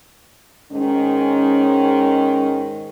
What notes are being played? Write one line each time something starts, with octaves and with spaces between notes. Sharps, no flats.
G#2 D#3 G#3 C#4